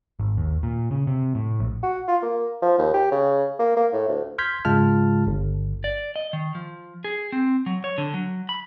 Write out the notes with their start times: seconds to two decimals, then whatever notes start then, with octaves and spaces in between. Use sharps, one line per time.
0.20 G#1
0.37 D#2
0.63 A#2
0.91 C#3
1.07 C3
1.35 A2
1.60 A#1
1.83 F#4
2.08 F4
2.23 A#3
2.62 F3
2.78 D#2
2.94 G4
3.11 C#3
3.59 A#3
3.77 A#3
3.93 A2
4.08 D2
4.38 C6 F6 G6 G#6 B6
4.65 G#2 C#3 G#3 F4 A5 F6
5.27 G1
5.84 D5
6.16 D#5
6.33 D#3
6.55 F3
7.04 G#4
7.32 C4
7.66 F#3
7.84 C#5
7.98 D3
8.14 F#3
8.49 B5